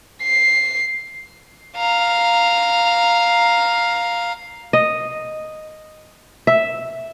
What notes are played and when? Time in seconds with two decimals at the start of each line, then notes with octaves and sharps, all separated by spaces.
0.22 C7
1.77 F5 A#5
4.73 D#5
6.47 E5